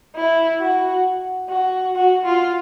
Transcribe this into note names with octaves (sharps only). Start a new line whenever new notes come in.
E4
F#4
F#4
F#4
F4